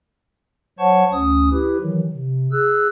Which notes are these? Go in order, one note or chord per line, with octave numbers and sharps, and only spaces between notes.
F#3 C5 C#5 F#5 A5 C#6
D2 C#4 D#6
E4 G4 B4
D#3 E3 F#3
C3
G#4 E6 F#6